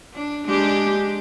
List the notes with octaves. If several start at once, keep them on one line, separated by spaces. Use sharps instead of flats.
D4
G#3 D4 G4